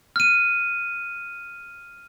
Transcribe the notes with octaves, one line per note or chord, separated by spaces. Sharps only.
F6 D#7